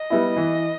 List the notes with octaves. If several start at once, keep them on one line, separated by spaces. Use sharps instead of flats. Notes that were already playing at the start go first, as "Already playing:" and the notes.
Already playing: D#5
G3 B3 E4
E3